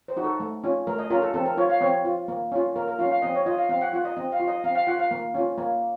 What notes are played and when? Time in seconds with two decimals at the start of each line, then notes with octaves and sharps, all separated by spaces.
0.08 C5
0.17 D#4 F#4
0.24 A4
0.40 A3
0.64 C#4 F4
0.87 A3 A#4
0.99 D#5
1.10 C#4 F4 A#4
1.22 A4
1.34 C4 A4
1.46 A#4
1.57 F4 C#5
1.70 F5
1.81 C4 C#5
2.05 F4
2.28 A#3
2.52 C#4 F4
2.76 A#3 A#4
2.88 A#4
2.99 C#4 F4 F5
3.11 F5
3.22 C4 D#5
3.35 C#5
3.46 F4 D#5
3.57 F5
3.69 C4 F5
3.81 F#5
3.93 F4 F#5
4.05 D#5
4.17 C4 D#5
4.32 F5
4.40 F4
4.48 D#5
4.64 C4 F5
4.75 F5
4.87 F4 F#5
4.99 F5
5.11 A#3
5.34 C#4 F4
5.58 A#3